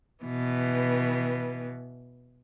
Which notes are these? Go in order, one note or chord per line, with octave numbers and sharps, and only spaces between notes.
B2 E3